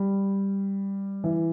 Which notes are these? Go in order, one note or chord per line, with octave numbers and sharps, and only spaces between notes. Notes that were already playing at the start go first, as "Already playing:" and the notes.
Already playing: G3
E3